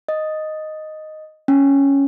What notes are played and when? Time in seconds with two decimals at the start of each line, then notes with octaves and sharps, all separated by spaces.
0.09 D#5
1.48 C#4